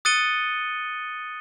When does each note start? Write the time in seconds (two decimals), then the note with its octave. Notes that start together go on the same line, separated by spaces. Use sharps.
0.05 D#6 F#6 A6 C#7 D#7 G7